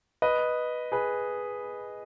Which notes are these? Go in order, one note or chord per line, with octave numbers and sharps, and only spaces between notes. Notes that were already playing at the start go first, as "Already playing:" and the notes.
B4 D#5
G#4 B4